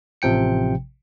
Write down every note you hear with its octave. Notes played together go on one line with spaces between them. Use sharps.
A1 C3 F3 G5 C#7